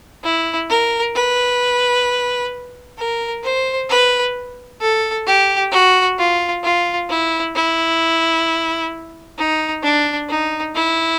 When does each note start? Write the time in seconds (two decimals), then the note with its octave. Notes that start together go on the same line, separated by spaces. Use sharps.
0.24 E4
0.69 A#4
1.15 B4
2.98 A#4
3.43 C5
3.89 B4
4.81 A4
5.27 G4
5.72 F#4
6.18 F4
6.63 F4
7.09 E4
7.55 E4
9.38 D#4
9.83 D4
10.29 D#4
10.75 E4